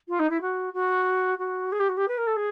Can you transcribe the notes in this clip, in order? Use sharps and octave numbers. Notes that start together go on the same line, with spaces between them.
F4
D#4
E4
F#4
F#4
F#4
G#4
G4
F#4
G4
B4
A#4
A4
G#4